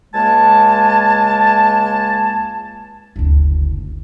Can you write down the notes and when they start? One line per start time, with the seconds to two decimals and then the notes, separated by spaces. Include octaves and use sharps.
0.14 C#2 G#3 A#3 G#5 A5
3.16 F#1 D2